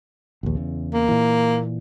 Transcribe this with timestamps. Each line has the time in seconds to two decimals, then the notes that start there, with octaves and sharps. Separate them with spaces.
0.43 A#1 D#2
0.55 E2 C#3
0.93 A#3
1.08 A#2 E3